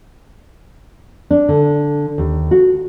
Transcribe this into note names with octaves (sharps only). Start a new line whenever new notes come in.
D4
D3
D#2
F#4